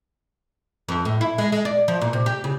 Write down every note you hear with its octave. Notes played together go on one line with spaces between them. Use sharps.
F2
A2
E4
G#3
G#3
D5
F3
A#2
C3
G4
C#3